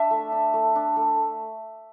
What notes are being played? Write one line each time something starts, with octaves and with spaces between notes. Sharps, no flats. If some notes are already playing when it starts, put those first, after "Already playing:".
Already playing: D4 E5
A3
D4
A3
D4
A3